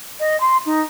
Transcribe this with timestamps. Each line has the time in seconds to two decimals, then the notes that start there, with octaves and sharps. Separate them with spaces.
0.20 D#5
0.40 C6
0.66 D#4